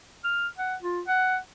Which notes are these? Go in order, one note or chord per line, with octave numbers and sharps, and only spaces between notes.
F6
F#5
F4
F#5